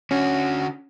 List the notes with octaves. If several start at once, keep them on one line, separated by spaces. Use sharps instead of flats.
D3 C#4 F#4